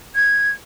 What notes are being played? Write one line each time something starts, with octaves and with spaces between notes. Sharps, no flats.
G#6